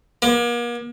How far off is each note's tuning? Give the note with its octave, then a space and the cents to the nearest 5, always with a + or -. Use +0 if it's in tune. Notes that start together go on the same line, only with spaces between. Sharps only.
A#3 +40